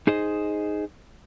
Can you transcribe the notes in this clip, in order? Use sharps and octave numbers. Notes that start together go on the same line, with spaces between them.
D#4 G#4 C5 D#5